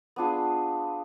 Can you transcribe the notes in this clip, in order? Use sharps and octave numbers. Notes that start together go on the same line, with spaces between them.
B3 D4 F4 G#4